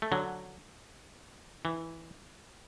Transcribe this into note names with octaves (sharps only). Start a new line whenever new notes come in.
A3
D3 F#3
E3